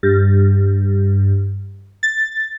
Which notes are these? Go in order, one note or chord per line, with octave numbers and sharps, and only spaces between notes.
G2
A6